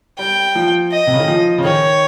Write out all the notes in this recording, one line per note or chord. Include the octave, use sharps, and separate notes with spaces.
G3 G5
F3
D#5
C3
C#3
D#3
F3
C#3
D#3 C#5